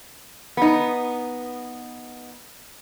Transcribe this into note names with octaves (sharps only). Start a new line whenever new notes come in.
B3 D#4